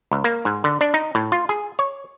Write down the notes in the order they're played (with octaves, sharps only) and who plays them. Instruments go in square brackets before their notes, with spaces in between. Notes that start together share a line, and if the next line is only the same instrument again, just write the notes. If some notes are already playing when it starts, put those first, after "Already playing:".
[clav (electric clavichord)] C#2
A#3
G#2
D3
D4
D#4
A2
F4
G#4
C#5